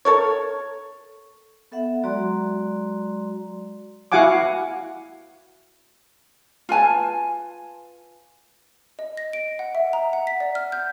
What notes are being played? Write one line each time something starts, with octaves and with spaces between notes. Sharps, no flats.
A4 A#4 C#5
B3 A4 E5 F#5
F#3 G#3 F#4 D5 A#5 C6
E4 F#4 F5 F#5 G#5 D6
F4 B4 G#5 A5
D#5
A#6
D7
F#5
E5
A#5
F#5
B6
D5
F6
G6